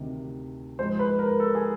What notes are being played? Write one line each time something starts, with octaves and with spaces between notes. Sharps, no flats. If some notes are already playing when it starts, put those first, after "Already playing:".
Already playing: D2 C3 D#3
G#2 F3 G#3 C5
B4
A#4
A4
G#4